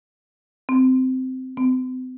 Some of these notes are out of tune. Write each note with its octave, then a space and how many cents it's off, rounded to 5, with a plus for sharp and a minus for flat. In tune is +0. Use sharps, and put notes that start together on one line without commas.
C4 -15
C4 -40